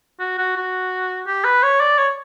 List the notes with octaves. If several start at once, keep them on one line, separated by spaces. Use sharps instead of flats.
F#4
F#4
F#4
G4
B4
C#5
D5
C#5